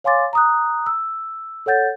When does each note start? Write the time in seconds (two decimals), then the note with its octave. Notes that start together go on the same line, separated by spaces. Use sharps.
0.04 C#5 F5 G#5 C6 D6 A6
0.33 A#5 D#6 F#6
0.86 E6
1.66 A4 C#5 F#5 G6 A6